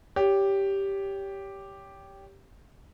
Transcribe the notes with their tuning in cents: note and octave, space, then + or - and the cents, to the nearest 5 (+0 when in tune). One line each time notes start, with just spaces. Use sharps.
G4 +0 C#5 +25